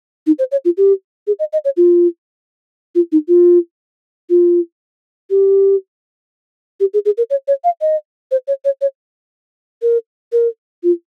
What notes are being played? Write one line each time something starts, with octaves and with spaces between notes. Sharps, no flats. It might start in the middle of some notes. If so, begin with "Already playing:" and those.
D#4
C5
C#5
F4
G4
G#4
D#5
D#5
C#5
F4
F4
D#4
F4
F4
G4
G4
G#4
G#4
A#4
C#5
C#5
F5
D#5
C5
C#5
C#5
C#5
A#4
A#4
F4